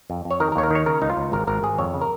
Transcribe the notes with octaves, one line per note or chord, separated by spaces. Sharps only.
F2
F2
C#5
D#3 A#4
A#4
D#2 C#5
A#4
D#3 C#5
C#3 A#4
C#2 D#4
F4
C#2
G#1 A#4
G#1 A#4
G#1 G#4
F2 C#5
C#3
A#4